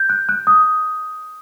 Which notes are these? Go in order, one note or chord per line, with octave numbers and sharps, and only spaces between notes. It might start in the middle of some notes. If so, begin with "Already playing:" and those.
Already playing: G6
F#6
F#6
D#6